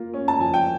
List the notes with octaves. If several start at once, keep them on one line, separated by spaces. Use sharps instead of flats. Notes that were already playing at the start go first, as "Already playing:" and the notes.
Already playing: A#3 F4
C#4
A5
F3 G#5
G5